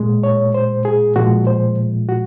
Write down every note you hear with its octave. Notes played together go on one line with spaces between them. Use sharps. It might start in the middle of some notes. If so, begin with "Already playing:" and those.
Already playing: A#2 G#3
C#5
C5
G#4
A#2 F3 G#3 F#4
C5
F#4